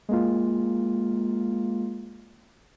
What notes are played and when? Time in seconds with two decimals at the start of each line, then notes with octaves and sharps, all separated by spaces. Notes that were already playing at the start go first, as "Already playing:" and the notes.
0.09 G#3 A#3 F4